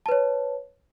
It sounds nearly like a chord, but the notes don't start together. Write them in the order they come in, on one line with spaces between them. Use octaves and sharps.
A5 B4 C#5